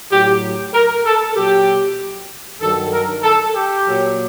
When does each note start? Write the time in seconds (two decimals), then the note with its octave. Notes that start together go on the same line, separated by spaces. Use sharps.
0.11 A2 F#3 G4
0.74 A#4
1.05 A4
1.35 A#2 F#3 G4
2.61 G2 D#3 F#3 A4
2.92 A#4
3.23 A4
3.54 G4
3.86 A#2 F#3